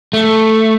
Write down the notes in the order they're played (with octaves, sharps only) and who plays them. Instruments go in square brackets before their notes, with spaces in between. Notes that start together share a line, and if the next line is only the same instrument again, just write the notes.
[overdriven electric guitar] A3